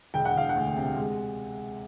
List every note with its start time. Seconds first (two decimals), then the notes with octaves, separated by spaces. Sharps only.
0.14 E1 G5
0.25 F#5
0.35 E1 F5
0.49 F#5
0.55 D2
0.76 C3
0.96 G#3